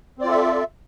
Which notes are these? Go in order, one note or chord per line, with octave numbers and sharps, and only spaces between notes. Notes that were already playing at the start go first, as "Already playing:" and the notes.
C4 F4 A4 D5 E5